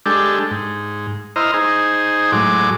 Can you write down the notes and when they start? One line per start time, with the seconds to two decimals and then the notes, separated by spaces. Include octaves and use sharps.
0.06 G#3 D4 G4 A4
0.51 G#2
1.36 E4 C5 D#5 A#5 F6
1.54 D#4 G#4 C5
2.32 A2 F#3 G#3 D6